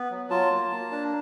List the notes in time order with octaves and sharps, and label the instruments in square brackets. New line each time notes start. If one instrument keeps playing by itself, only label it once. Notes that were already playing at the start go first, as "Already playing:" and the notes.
Already playing: [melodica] B3
F#3
F4 A5
A#3
A#3
D4